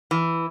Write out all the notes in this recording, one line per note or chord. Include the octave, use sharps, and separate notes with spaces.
E3